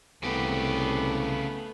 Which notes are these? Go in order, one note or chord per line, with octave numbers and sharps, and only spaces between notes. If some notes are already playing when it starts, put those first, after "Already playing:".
C2 C#3 A3 B3 G4